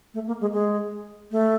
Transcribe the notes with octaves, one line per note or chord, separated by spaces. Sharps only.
A3
A#3
G#3
G#3
A3